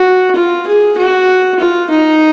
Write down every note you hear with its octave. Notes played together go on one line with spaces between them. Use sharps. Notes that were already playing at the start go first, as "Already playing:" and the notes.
Already playing: F#4
F4
G#4
F#4
F4
D#4